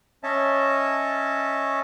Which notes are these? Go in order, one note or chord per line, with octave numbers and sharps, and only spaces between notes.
C#4 C#5 D#5 E5 A5